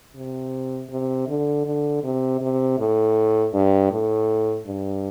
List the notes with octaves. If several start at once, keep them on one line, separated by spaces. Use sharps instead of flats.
C3
C3
D3
D3
C3
C3
A2
G2
A2
G2